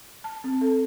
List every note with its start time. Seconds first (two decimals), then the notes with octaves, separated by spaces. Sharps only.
0.24 A5
0.44 C4
0.61 A4